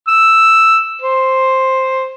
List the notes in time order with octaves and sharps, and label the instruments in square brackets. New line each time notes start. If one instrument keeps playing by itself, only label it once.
[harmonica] E6
C5